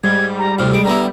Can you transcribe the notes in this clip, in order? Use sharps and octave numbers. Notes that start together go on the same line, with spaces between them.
G#2 G3 G#6
A#5
D2 A2 C3 F6
G#3 D7
D3 B3 E4 A#5